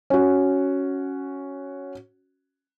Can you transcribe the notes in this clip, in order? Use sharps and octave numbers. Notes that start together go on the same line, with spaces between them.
C#4 F#4